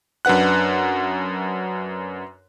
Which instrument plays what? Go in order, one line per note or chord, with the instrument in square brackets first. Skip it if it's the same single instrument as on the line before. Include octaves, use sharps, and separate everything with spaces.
[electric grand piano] F#2 D4 B4 F#5 F#6